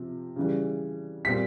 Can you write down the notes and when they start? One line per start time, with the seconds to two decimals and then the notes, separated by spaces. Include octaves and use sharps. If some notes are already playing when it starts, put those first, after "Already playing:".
Already playing: C3 F3
0.36 C#3 E3 G3
1.25 A#2 G3 C4 B6